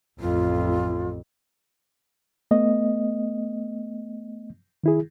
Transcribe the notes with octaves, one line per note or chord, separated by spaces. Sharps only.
A1 F2 F4
A3 B3 D#5
D#3 E4 G#4